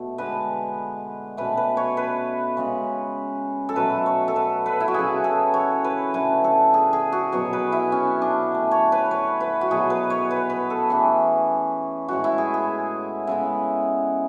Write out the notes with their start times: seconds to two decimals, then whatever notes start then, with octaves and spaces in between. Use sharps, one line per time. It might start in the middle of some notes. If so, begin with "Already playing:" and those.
Already playing: B2 A3
0.18 D3 G#3 B3 B4
1.37 B2 A3 C#4 B4
1.57 B4
1.77 C#5
1.97 B4
2.57 C#3 G#3 C#4
3.69 A4
3.76 B2 F#3 A3 B4
4.06 C#5
4.28 A4
4.36 B4
4.66 B4
4.80 E4
4.88 F#4
4.94 C#3 F#3 B3 G#4
5.24 A4
5.54 C#5
5.84 B4
6.14 D3 A3 C#4 B4
6.44 A4
6.74 G#4
6.93 G#4
7.12 F#4
7.32 B2 F#3 B3 C#5
7.53 B4
7.72 E4
7.92 C#4
8.22 D4
8.52 D3 A3 C#4
8.71 C#5
8.92 B4
9.11 C#5
9.41 B4
9.61 F#4
9.71 B2 F#3 B3 G#4
9.90 B4
10.10 C#5
10.31 B4
10.50 B4
10.70 A4
10.90 E3 A3 C#4 G#4
12.08 A2 G#3 C#4 F#4
12.24 E4
12.38 G#4
12.54 G#4
13.27 C#3 G#3 B3 E4